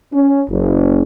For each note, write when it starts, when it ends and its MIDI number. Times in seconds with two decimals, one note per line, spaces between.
0.13 0.41 61
0.49 1.03 30